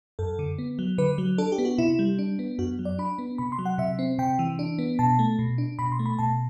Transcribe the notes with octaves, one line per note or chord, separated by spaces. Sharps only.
F#2 A4
D3
B3
F#3
D3 B4
F#3
D4 A4
G4
B3
F#4
C3 E4
G3
D4
B3
F#2 F#4
F#3
D5
D4 B5
B3
C3 B5
C6
F#3
F#5
C3 E5
C4
C3 G5
E3
D4
B3
B2 A5
A3
B2
D4
B2 B5
C6
A3
B5
B2 A5